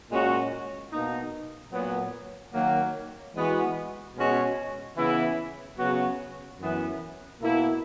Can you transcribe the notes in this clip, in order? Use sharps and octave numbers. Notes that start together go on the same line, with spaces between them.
A#2 G#3 C#4 F#4
B2 A#3 D#4
A#2 F#3 B3
D#3 F#3 A#3
E3 G#3 B3 F#4
B2 G#3 C#4 F#4
C#3 E3 B3 E4
C#3 F#3 B3 F#4
F#2 E3 B3
B2 A#3 E4